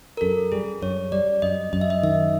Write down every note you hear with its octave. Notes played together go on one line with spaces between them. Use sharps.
A#4
F#2 A4
G3 G#4
F#2 C#5
G3 D5
F#2 D#5
F#2 D#5
E5
D#5
D#3 E5